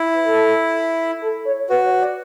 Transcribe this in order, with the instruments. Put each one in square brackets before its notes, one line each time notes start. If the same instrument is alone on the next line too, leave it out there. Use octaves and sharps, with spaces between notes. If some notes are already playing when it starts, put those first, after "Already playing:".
Already playing: [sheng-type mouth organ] E4
[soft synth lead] B4
A4
A4
C#5
[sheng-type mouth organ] F#4 [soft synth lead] B4
[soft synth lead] C#5
D5